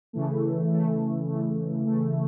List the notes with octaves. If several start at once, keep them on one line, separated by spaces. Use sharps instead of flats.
C#3 E3 A3
C#3 E3 A3
C#3 E3 A3
C#3 E3 A3